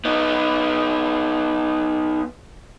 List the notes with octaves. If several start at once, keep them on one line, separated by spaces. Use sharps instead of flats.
B3 D#4